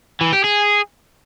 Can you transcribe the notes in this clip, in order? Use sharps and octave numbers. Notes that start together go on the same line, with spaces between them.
E3
G4
G#4